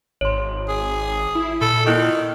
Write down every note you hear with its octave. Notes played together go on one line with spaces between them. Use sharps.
G#1 C#5 C6
G#4
E4
A#2 A4 B5
D#3 A#3 E4 C#6